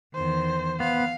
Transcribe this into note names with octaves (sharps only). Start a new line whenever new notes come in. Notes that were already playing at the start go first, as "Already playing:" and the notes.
E2 D#3 C5
B3 F5